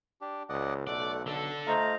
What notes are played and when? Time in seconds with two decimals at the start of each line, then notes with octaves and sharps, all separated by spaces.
0.21 D4 G4
0.49 C#2 D5 D#5 F#5
0.87 B1 A3 D5 F#5
1.26 D3 A4 E6
1.67 A3 F4 C5 D#5 F5 A#5